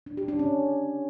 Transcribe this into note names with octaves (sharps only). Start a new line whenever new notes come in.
D4
G4
D4
C#4